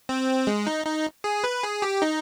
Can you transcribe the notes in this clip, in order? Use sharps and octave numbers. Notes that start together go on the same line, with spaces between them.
C4
G#3
D#4
D#4
G#4
B4
G#4
G4
D#4